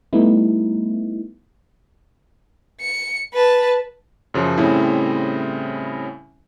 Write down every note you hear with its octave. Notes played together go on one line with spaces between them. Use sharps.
G3 A3 B3 D#4 E4
C#7
B4 A5
F#2 C#3 F3
A2 C#3 G3 C4 E4